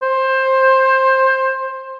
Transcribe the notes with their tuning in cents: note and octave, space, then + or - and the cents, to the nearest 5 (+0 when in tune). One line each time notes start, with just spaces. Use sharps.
C5 +15